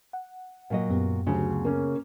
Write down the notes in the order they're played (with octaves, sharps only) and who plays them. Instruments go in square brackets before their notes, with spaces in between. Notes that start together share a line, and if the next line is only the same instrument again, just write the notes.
[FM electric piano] F#5
[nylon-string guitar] A#2 F#3 D#5
[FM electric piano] F#2 B3 G4
[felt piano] D2 F#3 [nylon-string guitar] C#3
[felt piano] A#3 C#4